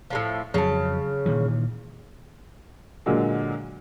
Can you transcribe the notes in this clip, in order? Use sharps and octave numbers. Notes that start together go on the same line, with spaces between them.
A2 C#3 F3
F2 C#3 F#3 A5
A#2 D#3 E3
A#2 D3 F#3 G#3